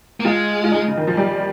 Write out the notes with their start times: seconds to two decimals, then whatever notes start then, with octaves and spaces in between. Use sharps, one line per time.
0.20 A#3
0.25 G#3 F4
0.64 F4
0.72 D#4
0.88 C#3
0.97 D#3
1.07 F3
1.17 G3